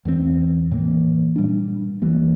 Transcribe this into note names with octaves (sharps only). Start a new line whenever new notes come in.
E2 E3 G3 C4
A2 E3 A#3
A#2 G3 D4
E2 E3 G3 A#3